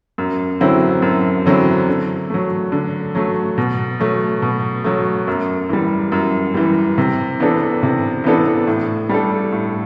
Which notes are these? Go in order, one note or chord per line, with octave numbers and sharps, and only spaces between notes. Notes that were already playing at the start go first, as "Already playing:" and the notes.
F#2
D3 F#3 C4 E4
F#2
D3 F#3 C4 E4
D3
F#3 A3
D3
F#3 A3
B2
F#3 A3
B2
F#3 A3
F#2
E3 G3
F#2
E3 G3
C3
E3 B3 D4 A4
C3
E3 B3 D4 A4
A2
G3 D4 A4
A2